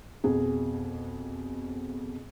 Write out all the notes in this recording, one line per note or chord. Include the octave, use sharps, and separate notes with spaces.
F2 B2 G#4